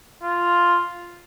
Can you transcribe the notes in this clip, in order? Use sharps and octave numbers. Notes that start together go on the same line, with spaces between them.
F4